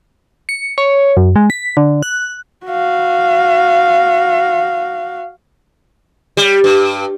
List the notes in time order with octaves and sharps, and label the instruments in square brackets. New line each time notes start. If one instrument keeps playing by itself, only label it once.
[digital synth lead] C#7
C#5
F#2
G#3
B6
D3
F#6
[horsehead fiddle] F#4 F5
[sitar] G3
G2